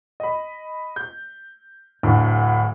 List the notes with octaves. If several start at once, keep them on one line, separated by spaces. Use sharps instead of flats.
D#5 B5
G6
D1 D2 A2 A3